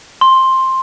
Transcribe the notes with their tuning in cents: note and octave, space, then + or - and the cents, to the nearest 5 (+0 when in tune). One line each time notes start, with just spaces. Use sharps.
C6 +10